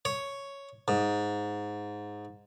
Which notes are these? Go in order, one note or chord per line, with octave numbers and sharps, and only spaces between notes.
C#5
G#2